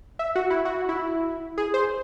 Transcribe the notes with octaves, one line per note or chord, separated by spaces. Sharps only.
E5
F#4
E4
F#4
E4
G#4
C5